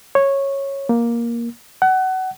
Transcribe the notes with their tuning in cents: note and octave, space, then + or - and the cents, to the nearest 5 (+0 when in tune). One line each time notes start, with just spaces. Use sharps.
C#5 -10
A#3 +10
F#5 +25